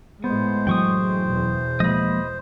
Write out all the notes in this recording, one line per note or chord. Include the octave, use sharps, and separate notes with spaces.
A2 G#3 B3 C5
F#2 E3 F#3 G5 C#6 D#6
E2 B2
F3 G#3 A#3 D#5 B5